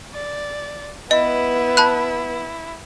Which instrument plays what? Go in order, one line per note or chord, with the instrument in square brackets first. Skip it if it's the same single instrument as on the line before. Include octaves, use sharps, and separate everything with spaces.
[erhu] D5
[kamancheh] B3 B4 [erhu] E4 [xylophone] D#5
[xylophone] A5 B5 F#6